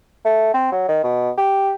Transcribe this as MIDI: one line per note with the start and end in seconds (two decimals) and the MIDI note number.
0.25 0.51 57
0.53 0.71 60
0.72 0.86 54
0.88 0.99 51
1.04 1.30 47
1.37 1.73 67